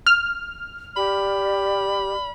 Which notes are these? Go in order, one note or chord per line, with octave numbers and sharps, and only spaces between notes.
F6
G4 D5 B5